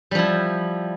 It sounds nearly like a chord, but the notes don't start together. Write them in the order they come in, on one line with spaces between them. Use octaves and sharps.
G3 F3 E4